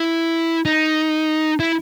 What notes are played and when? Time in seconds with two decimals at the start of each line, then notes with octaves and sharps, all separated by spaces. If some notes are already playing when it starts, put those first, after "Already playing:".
Already playing: E4
0.65 D#4
1.60 E4